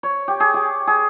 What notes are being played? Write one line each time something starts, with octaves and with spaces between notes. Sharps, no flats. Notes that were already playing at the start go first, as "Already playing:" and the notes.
C#5
G4
G#4
G4
G#4